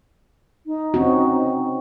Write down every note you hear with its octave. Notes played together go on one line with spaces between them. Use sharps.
D#4
C4 C#4 F#4